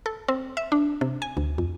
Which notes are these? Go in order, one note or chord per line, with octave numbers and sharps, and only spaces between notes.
A4
C4
E5
D4
C3
G#5
D2
F2